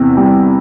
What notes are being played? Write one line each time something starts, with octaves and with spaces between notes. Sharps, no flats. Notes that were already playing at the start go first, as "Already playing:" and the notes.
Already playing: E2 C3 E3
G3